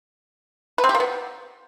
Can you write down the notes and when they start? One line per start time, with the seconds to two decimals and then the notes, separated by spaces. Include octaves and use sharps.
0.78 B4
0.84 C4
0.89 G4
0.95 A#3
1.00 B3